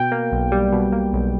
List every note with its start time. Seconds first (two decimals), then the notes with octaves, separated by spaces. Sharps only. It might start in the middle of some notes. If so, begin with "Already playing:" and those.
Already playing: B2 G5
0.12 A#3
0.32 B1
0.52 G3
0.72 B2
0.92 A#3
1.13 B1